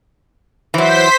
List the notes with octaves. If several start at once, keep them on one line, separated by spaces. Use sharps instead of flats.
E3 F#3 C5 B6